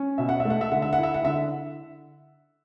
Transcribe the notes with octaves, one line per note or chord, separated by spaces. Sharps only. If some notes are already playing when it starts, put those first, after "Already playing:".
Already playing: C#4
B2 E5
F#5
E5
A3
F#5
E5
D3 F#5
E5
F#5
E4 E5
F#5
D3 E5